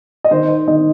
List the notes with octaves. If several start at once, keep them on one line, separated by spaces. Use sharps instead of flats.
D#5
D#3 C5
C5
D#3 D#5